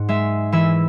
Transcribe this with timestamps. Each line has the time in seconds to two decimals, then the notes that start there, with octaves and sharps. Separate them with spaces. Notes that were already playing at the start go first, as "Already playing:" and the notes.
Already playing: G#2 F#5
0.09 G#3 E5
0.52 E3 E5